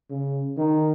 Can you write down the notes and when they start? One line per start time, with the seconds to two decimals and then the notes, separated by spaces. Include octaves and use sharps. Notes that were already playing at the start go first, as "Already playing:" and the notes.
0.10 C#3
0.58 D#3